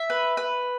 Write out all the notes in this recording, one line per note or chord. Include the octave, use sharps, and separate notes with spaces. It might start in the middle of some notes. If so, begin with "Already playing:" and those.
Already playing: E5
B4
B4